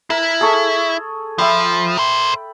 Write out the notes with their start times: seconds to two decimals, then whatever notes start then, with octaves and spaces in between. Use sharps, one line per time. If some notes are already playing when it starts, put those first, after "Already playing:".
0.10 E4 A#4
0.41 G#4 A4 C#6
1.38 F3 E5 G5 B5
1.97 A#4 C5